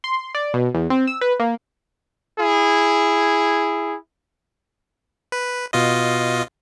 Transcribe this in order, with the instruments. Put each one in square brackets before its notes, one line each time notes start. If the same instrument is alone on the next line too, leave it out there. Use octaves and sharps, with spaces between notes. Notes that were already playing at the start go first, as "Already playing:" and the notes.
[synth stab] C6
D5
B2
E2
C4
E6
B4
A#3
[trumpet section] E4 G#4
[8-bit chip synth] B4
B2 F4 D#5